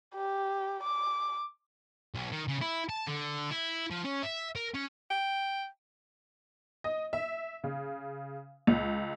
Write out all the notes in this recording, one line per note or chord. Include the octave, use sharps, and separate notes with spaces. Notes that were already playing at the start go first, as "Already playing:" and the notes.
G4
D6
B1
D#3
C#3
E4
A5
D3
E4
F3
C#4
E5
A#4
C#4
G5
D#5
E5
C#3
C#2